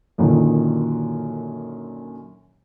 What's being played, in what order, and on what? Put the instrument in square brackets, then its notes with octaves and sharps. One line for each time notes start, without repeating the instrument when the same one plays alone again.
[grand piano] F#2 A#2 D3 D#3